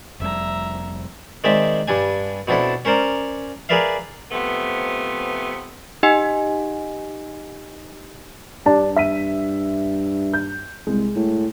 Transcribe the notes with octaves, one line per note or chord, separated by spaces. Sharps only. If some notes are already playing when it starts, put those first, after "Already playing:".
F1 F2 G3 E5 A#5
D#3 G#3 C4 D5 E5
G2 G3 D4 G#5
B2 C4 D4 E4 A4
C#4 A#4 C5 D5 A#5
G#4 A#4 B4 D5 E5 F5
C3 F3 A3 B3
D#4 G4 D#5 F#5 G#5
G2 D4 G4 A5
E5 B6 D#7
G6
C2 G#3
A2